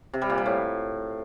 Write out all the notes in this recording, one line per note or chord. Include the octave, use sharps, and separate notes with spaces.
C3
G3
A#2
G3
A2